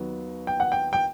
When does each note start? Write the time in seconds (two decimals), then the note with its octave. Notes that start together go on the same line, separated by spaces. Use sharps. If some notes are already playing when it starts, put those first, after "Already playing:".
Already playing: D#2 D#3 F#3 B3
0.47 G5
0.60 F#5
0.72 G5
0.93 G5